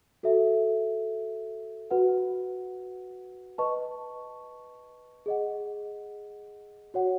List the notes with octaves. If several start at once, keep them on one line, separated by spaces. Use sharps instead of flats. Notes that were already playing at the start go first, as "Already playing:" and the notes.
F#4 A4 E5
F#4 B4 F#5
B4 D#5 A5 C#6
G#4 D#5 F#5
F#4 C#5 F#5